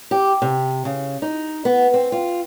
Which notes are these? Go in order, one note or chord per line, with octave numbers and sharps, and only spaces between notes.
G4
C3
C#3
D#4
B3
C4
F4